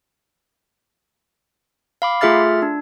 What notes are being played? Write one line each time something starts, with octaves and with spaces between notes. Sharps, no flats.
F5 B5 D6
A3 F4 G#4 E5 F6 A6
D4